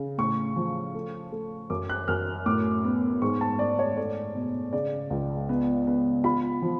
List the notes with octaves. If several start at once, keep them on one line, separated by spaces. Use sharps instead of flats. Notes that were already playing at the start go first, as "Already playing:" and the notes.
Already playing: C#3
A2 C#6
F3
A3
A3
F#2 D6
F#6
F#2 F6
A2 D6
B3
G#2 C#6
A5
G#2 D5
C#5
A3 D5
B2
C#3 D5
C#2
B3
B3
F4 B5
F3